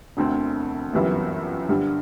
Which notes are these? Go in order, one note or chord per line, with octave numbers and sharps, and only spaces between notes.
E1 D2 D3 A3 C4
G1 F#2 E3 G3 B3
G2 D3 G3